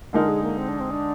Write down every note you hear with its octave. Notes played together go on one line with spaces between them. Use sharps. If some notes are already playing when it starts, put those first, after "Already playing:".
D3 G#3 D#4 A#4
G#4
A#3
C4
D4
C4
D4